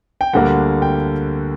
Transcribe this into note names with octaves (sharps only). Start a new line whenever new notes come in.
G5
D2 D3 G3 A#3 F#5
G5